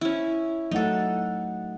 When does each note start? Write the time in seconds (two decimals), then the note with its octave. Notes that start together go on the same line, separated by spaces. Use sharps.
0.01 C#4 E4
0.71 F#3 A3 D#4 A4 F#5